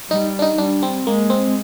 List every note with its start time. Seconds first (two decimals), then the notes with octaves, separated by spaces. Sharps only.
0.10 G3 D#4
0.39 D4
0.42 D#4
0.58 G3 D4
0.83 C4
1.07 G#3 A#3
1.30 C4